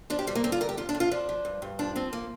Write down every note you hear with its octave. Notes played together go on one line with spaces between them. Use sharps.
F3 D4
G4
G2 G3
A#3
D3 C4
F4
G2 A#4
G4
F2 F4
D4
F2
F4
F3 D4
F3
G2
G2
F3 D4
F3 C4
A#3